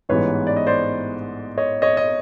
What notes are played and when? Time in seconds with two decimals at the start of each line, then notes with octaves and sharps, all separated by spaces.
0.09 A1 G#2 E3 G3 B3 B4 C#5
0.47 D5
0.56 D#5
0.67 C5 D5
1.58 C#5 D#5
1.82 C#5 D#5
1.97 D#5